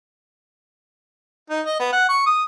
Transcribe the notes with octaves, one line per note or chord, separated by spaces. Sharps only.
D#4
D#5
B3
F#5
C#6
D#6